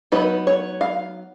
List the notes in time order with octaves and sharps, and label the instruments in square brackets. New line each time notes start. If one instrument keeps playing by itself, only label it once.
[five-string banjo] F#3 B3 D#4 B4
C#5
F5